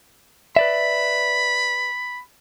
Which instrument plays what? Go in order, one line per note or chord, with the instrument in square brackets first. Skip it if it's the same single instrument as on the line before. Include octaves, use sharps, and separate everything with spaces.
[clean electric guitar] B4 D5 E5 [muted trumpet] B5